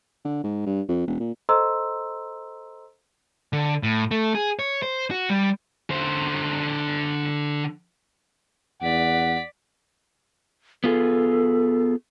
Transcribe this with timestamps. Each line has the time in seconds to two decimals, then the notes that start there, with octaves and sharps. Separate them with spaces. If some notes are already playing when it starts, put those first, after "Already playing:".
0.25 D3
0.44 G#2
0.66 G2
0.88 F2
1.07 E1
1.20 A#2
1.49 A4 C5 D#5 A#5 C6 E6
3.53 D3
3.83 A2
4.11 A3
4.35 G#4
4.59 C#5
4.82 C5
5.11 F#4
5.30 G3
5.90 D3 C5
8.82 E2 D5 F#5 B6
10.84 B3 F4 G#4 A4